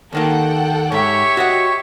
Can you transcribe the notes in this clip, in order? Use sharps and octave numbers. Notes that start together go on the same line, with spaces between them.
D#2 D#3 A#3 A4 F#5 G5
G#2 G4 C#5 E5 C#6
F#4 D#5 F#5